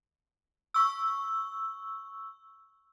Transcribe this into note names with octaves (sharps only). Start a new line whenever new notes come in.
C#6 E6